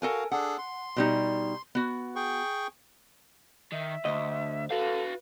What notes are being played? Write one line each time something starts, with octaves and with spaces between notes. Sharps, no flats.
F#4 A4 A#4 F5 G#5
D4 G#4 A4 F#5
C6
B2 G3 D#4
B3 F#4
G#4 G5 C#6
D#3 E5
D2 C5 D#5
F#4 A4 B4 F5